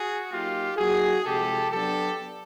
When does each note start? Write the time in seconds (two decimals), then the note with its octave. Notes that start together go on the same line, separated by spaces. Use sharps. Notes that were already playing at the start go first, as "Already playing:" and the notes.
Already playing: F#4 G#4
0.30 F#3 A#3 D#4 F4 G4
0.77 F#3 A#3 D#4 F#4 G#4
1.24 C3 F3 G#3 G4 A4
1.71 F#3 B3 D4 G4 A4